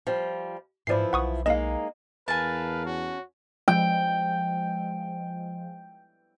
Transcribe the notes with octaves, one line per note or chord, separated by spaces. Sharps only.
F3 G3
G#2 E3 F3 E4 D5 C7
B1 F#5 C#6 D#6
G#3 A#3 D#4 D#5 F5
E2 A#4 B4 F5 G#5 A5
C#4 F#4
F3 G#3 G5